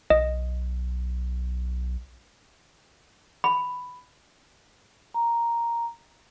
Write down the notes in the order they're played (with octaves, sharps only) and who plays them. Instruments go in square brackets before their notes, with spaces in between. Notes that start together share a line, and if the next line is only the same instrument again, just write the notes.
[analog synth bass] B1 [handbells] D#5
[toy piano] B5
[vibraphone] A#5